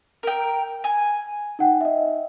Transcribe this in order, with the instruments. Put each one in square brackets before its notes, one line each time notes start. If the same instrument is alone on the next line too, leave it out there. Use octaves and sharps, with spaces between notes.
[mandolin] A#4 G5
G#5
[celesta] D#4 F#5 G5
D#5 E5